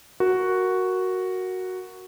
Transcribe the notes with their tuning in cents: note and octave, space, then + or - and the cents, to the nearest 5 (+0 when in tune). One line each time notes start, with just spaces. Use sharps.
F#4 +0 A#4 +0